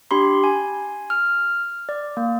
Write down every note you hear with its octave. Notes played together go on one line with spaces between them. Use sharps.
D4 G4 B5 C6
G#5
F6
D5
A#3